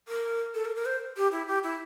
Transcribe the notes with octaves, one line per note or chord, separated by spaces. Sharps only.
A#4
A4
A#4
A#4
C5
G4
E4
G4
E4